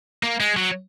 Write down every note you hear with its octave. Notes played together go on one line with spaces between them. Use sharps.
A#3
G#3
F#3